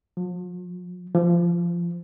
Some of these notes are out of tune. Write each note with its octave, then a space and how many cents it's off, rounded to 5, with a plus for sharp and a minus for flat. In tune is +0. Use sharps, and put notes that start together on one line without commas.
F3 +45
F3 -15